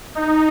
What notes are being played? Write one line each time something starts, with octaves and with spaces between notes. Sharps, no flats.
D#4